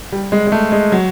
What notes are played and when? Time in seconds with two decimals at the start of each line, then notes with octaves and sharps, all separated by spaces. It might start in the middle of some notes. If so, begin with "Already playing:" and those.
0.12 G3
0.32 G#3
0.47 G#3
0.52 A3
0.72 G#3
0.92 F#3